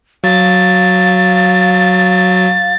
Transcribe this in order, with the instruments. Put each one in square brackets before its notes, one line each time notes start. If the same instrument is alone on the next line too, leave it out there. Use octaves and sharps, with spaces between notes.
[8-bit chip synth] F#3 [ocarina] F5 [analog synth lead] A6